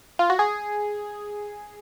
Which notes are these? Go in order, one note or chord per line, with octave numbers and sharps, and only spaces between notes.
F4
F#4
G#4